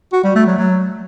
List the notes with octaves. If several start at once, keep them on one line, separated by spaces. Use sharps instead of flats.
F#4
G3
A3
F#3
F#3